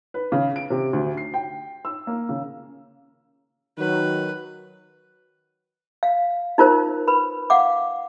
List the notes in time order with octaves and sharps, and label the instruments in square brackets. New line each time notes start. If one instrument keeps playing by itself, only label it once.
[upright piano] B4
C#3
D7
C3
D2
C7
G5
E6
A#3
C#3
[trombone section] D#3 F#3 [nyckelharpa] B4
[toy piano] F5
D#4 F4 A#4 C5
B4 B5
F5 F#5 D6